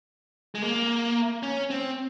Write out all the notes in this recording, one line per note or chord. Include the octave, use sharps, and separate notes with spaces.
G#3
A#3
C#4
C4